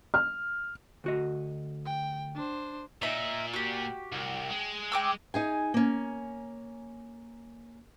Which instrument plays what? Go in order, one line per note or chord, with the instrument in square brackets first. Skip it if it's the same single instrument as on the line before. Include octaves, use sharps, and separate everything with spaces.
[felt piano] F6
[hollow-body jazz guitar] D2 F#4 D#5
[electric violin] G5
D4 C5
[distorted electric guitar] A#2 [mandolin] D#4 E5
[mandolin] F#4 G4
[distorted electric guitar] C2
G#3
[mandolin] G5 D6 E6
[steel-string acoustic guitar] D#4 G#4 G#5
A#3 C#4